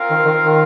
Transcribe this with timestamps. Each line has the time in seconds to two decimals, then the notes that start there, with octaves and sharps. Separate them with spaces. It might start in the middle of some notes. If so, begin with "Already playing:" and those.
Already playing: C4 F4 A#4 F5
0.10 D#3
0.25 D#3
0.42 D#3